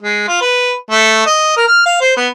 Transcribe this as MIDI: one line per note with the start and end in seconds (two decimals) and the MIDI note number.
0.03 0.26 56
0.28 0.38 65
0.42 0.72 71
0.91 1.22 57
1.26 1.52 75
1.56 1.67 70
1.68 1.84 89
1.86 1.97 77
2.01 2.14 72
2.17 2.28 59